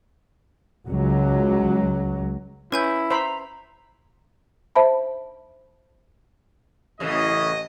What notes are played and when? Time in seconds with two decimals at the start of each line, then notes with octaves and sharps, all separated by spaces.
0.87 C#2 F#3
2.72 C#4 E4 B4 G#5 G6
3.11 C5 E5 A#5 B5
4.75 C5 E5 A5 B5
7.00 A1 F#2 C#3 E3 D#5